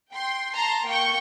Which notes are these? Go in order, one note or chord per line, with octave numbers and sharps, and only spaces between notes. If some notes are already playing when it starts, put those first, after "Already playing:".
G5 C6
A5 A#5 C6
A#3 G5 C#6 G6